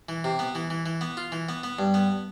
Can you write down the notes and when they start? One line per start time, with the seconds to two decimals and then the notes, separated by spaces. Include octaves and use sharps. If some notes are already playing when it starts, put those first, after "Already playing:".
0.09 E3
0.24 C3
0.39 B3
0.55 E3
0.70 E3
0.86 E3
1.01 B3
1.17 F4
1.32 E3
1.49 B3
1.64 B3
1.79 G2
1.94 B3